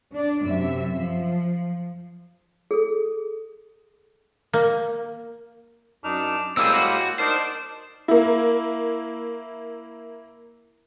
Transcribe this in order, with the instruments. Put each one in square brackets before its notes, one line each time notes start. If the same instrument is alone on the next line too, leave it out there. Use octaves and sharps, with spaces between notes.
[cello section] D4 D5
F#2 C3 E5
F3
[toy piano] G#4 A4
[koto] A#3
[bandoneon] F#2 D#4 F6 [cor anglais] D4
[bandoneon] A2 G#3 A#3 [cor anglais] G3 [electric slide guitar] C4 G4 G#4 [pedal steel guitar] E6
[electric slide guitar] F#4
[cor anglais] D4 [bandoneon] D#4 A#4 D5 [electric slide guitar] C5
[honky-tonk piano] A#3 E4